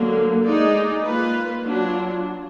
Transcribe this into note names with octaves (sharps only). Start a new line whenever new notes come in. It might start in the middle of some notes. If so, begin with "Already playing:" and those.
Already playing: D3 F#3 A#3
G#3 D#4 G#4 D5
A#3 F4 B4
F#3 D4 F4